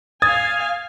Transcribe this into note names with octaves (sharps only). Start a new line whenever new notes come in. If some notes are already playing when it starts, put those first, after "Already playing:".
F5 G#5 D#6 G#6 A6